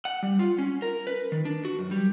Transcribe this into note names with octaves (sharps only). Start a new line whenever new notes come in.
F#5
G3
F4
C#4
A#4
B4
D#3
D4
F#4
F#2
G3